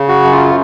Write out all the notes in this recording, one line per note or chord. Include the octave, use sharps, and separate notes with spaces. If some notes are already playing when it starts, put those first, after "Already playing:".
Already playing: C#3
F#4
F#2
F4